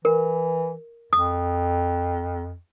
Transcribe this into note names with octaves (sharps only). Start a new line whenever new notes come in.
E3 A#4
F2 D#6